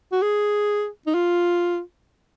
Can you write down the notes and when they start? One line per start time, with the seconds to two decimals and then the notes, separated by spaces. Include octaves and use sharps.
0.12 F#4
0.22 G#4
1.07 D#4
1.15 F4